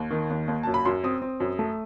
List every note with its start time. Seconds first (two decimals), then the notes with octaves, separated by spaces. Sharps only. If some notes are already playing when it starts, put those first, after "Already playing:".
Already playing: D#2
0.11 D#3
0.30 D#2
0.48 D#2
0.63 F#2 A5
0.74 B5
0.85 F#2 C6
1.03 C4 D#6
1.22 C4
1.40 F#2
1.59 A3